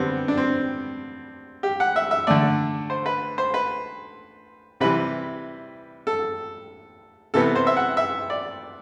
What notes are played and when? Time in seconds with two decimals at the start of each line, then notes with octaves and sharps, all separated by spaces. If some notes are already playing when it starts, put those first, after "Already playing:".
Already playing: D3 G3 B3 C4
0.28 D4
0.37 C4
1.63 G4
1.80 F#5
1.96 E5
2.11 E5
2.27 D3 A3 D5
2.90 C5
3.06 B4
3.38 C5
3.54 B4
4.80 C3 E3 G3 B4
6.07 A4
7.34 C3 E3 B3 A4
7.56 C5
7.67 E5
7.77 F#5
7.97 E5
8.30 D5